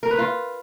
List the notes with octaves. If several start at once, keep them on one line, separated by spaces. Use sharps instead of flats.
A#4
B4
F4